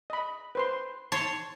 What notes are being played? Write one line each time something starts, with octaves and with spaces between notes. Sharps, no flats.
D#5 B5
B4 C5 C6
C#5 A5 C6